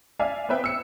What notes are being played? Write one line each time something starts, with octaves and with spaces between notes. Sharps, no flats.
D5 E5 F5 G#5
B3 C4 B4 E5 G5
E6 C#7